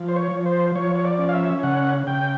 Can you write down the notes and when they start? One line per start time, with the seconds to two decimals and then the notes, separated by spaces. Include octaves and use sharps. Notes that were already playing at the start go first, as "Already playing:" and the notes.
Already playing: F3
0.08 C5
0.16 C#5
0.32 F3
0.45 C5
0.76 F3 C#5
0.96 C#5
1.05 D5
1.19 C#4
1.29 F5
1.33 E5
1.63 C#3 F#5
2.07 C#3 G5